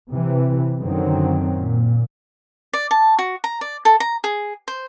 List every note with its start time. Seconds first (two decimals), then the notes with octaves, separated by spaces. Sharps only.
0.11 C3 E3
0.80 F#2 D3 D#3 F#3 C4
1.51 A#2
2.73 D5
2.91 A5
3.19 F#4
3.44 A#5
3.61 D5
3.85 A4
4.00 A#5
4.24 G#4
4.68 C5